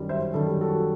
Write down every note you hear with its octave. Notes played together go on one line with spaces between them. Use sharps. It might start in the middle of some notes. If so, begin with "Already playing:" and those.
Already playing: F#2 D#3 G3
C5 E5
F#2 D#3 G3 A4
G4
F#4 A4